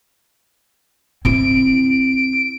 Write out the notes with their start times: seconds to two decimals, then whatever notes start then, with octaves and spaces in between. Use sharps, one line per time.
1.25 C4 E4 D7